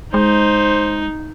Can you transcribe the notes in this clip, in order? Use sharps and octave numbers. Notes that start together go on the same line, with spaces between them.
G#3 D#4 C5